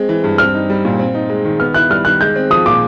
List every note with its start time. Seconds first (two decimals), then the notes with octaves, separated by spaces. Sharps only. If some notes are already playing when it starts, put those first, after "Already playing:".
Already playing: G#3 C4
0.09 E3
0.24 G2
0.38 C4 F6
0.54 D#4
0.70 G3
0.85 A#2
0.99 C4
1.14 D#4
1.30 G#3
1.45 D#3
1.60 B3 F6
1.74 E4 F#6
1.90 G3 F6
2.05 D#3 F#6
2.21 G#3 G6
2.36 C4
2.50 F3 D#6
2.66 A#2 D6